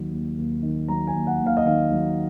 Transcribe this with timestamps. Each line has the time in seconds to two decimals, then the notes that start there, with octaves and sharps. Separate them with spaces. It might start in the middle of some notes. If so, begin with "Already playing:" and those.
Already playing: D#2 D#3 F#3
0.11 D#2
0.37 D#2
0.63 D#3
0.88 F#3 A#5
1.07 G#5
1.14 D#2
1.27 F#5
1.40 D#2
1.46 F5
1.57 D#5
1.65 D#3 F5
1.92 F#3